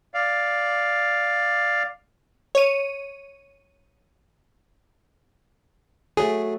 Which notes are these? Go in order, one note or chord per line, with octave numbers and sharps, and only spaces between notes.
D5 F5
C#5 D#7
F#3 A3 G#4